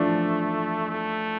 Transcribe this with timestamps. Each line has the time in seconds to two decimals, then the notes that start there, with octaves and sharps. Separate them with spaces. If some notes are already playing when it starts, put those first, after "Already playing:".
Already playing: E3 F3 A3 D4
0.91 A3